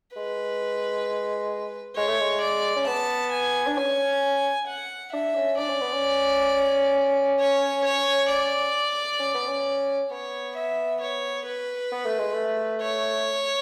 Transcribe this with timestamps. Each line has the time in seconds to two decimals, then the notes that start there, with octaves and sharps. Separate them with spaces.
0.16 G#3 B4
1.96 G#3 C#5
2.08 A3
2.21 G#3
2.42 D5
2.76 C#4
2.87 B3 A5
3.32 G#5
3.67 D4
3.78 C#4 G#5
4.68 F#5
5.13 D4 E5
5.36 C#4
5.58 D4 D5
5.70 C#4
5.82 B3
5.93 C#4
7.39 C#5
7.85 C#5
8.30 D5
9.20 C#4
9.34 B3
9.48 C#4
10.11 B3 C#5
10.57 E5
11.02 C#5
11.46 B4
11.92 B3
12.05 A3
12.19 G#3
12.33 A3
12.81 C#5